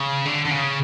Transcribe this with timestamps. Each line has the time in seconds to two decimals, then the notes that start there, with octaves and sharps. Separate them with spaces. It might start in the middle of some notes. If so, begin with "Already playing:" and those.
Already playing: C#3
0.26 D3
0.45 D3
0.51 C#3